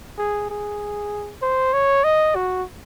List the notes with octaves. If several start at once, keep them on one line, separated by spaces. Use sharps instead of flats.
G#4
G#4
C5
C#5
D#5
F#4